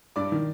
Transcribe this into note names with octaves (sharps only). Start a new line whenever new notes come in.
G2 D5 D6
D#3